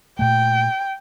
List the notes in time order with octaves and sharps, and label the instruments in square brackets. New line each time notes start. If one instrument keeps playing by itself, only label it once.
[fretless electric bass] A#2 A3 [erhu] G5